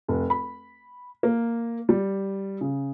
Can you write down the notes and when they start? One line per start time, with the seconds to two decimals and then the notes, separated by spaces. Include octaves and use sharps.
0.08 F1
0.30 B5
1.23 A#3
1.89 G3
2.61 C#3